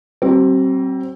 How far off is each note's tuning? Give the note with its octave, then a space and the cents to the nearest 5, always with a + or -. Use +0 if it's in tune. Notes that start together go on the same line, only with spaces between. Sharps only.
G3 -45 C4 +20